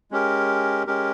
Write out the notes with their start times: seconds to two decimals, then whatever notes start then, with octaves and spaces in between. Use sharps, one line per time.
0.11 G#3 C#4 G4 A#4
0.87 G#3 C#4 G4 A#4